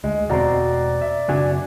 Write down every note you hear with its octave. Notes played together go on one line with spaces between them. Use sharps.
D2 G#3
E1 B2 C4 F#4 D5 A#5
E5
F#2 C#3 C4 D4 F#4 G#5